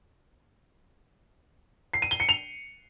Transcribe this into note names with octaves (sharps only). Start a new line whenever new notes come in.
C7
D#7
G7
C#7
F7